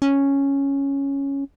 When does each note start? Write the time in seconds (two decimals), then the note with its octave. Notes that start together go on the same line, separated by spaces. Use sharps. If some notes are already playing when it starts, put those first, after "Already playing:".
0.02 C#4